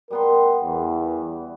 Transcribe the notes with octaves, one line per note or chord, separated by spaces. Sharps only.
G3 B3 A#4 C6
E2